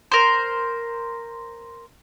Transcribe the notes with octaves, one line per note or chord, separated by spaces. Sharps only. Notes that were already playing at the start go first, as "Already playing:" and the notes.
A#4 C5